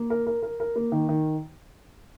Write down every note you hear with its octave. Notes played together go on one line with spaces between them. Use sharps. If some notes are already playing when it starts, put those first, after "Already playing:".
Already playing: A#3
A#4
A#4
A#4
A#4
A#3
D#3
D#3